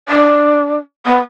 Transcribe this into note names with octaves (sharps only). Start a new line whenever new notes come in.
D4
B3